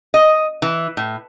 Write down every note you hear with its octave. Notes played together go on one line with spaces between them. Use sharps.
D#5
E3
A2